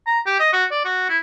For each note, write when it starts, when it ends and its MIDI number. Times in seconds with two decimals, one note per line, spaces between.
0.07 0.19 82
0.26 0.38 67
0.40 0.48 75
0.53 0.65 66
0.71 0.83 74
0.84 1.08 66
1.09 1.18 64